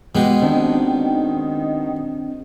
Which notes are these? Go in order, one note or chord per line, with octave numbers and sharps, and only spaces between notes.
B2 G#3 B3 G4
D#3 C4 D4